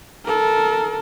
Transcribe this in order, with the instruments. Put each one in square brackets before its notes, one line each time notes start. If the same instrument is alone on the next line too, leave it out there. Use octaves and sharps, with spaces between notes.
[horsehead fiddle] A4 A#4